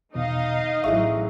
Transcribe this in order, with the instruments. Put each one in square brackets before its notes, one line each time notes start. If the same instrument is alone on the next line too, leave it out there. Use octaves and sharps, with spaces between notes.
[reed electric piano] E2 B2 D#3 [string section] D#4 D#5 F5
[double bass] A1 F#3 [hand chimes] E4 G#4 E5 [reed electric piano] C#6